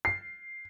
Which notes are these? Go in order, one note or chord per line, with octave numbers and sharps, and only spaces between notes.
C7